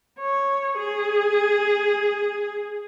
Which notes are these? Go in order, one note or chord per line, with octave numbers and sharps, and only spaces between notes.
C#5
G#4